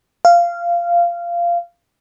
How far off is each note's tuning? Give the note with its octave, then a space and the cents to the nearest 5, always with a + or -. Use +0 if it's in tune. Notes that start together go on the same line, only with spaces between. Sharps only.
F5 -15